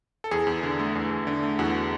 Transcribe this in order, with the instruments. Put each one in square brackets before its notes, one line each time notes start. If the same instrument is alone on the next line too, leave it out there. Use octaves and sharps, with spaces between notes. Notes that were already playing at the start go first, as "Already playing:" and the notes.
[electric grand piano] A4
E2 G#4
E2
D3
A3
E2
E2
D3
A3
E2 F#4